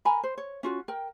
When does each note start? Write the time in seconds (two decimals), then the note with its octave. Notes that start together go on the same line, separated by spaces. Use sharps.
0.05 A#4 G#5 A#5 B5
0.23 C5
0.37 C#5
0.63 C#4 F4 F#4
0.88 A#4 G5